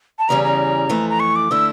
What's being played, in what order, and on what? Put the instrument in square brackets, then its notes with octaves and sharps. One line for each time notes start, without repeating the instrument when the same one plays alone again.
[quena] A5
[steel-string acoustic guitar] E2 C#3 E3 G3 C#4 [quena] A#5
[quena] A#5
[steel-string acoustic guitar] F2 E3 A3
[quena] A#5
C#6
D6
[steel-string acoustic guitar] D3 A3 E4 [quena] E6